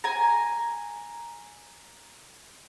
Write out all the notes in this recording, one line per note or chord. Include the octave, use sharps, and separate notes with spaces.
G#5 A#5